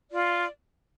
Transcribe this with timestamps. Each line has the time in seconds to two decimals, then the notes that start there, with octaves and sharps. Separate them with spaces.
0.10 F4 D5